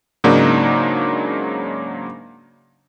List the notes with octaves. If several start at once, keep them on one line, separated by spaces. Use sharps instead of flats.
G#2 C#3 F#3 A#3 D4 D#4